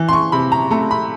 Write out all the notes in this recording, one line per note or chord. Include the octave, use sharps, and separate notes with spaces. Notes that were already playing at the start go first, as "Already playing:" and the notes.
Already playing: E3
C6
C#6
C3 B5
A#5
A3 A#5
B5